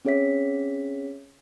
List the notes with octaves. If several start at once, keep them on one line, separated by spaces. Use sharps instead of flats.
C4 C#4 G#4 C#5 E5 B6